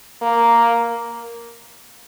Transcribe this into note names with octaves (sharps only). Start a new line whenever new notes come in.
A#3